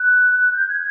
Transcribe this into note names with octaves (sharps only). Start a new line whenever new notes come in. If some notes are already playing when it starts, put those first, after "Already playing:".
Already playing: F#6
G6
G#6